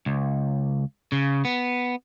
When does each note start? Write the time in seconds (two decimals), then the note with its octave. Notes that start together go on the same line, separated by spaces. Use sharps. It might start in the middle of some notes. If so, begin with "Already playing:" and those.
0.06 C#2
1.12 C#3
1.45 B3